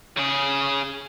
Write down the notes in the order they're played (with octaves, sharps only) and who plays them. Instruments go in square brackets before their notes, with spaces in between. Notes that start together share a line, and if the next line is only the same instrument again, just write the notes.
[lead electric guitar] C#3 G#4